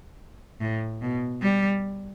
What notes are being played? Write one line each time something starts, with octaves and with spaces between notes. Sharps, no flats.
A2
B2
G3